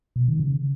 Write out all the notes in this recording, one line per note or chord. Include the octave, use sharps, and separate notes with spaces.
B2
D#3
C#3